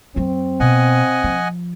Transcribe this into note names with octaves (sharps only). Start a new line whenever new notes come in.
F#2 F#3 C4
B2 D#5 F#5 G#5
F3